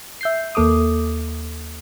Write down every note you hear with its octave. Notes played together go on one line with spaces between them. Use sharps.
E5 G6 C7
D#2 A#3 A4 D6 D#6